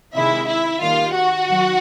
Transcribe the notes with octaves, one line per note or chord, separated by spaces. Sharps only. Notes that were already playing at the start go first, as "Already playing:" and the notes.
C3 D#3 G#3 E4 E5
E4 E5
D#3 G3 A#3 F4 F5
F#4 F#5
D#3 F#3